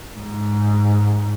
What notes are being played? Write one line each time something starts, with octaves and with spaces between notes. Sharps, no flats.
G#2